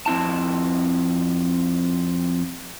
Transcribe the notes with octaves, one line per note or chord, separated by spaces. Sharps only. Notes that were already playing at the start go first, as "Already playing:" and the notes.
F2 C4 E4 A5